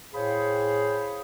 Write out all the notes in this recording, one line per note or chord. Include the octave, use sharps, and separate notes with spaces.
A2 G#4 C5 C#5 F5 B5